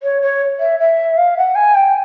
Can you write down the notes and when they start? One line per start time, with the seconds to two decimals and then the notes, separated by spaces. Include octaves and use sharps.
0.02 C#5
0.22 C#5
0.59 E5
0.79 E5
1.17 F5
1.37 F#5
1.55 G#5
1.75 G5